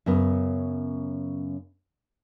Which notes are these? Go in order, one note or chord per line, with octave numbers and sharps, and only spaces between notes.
F#2 C#3 B3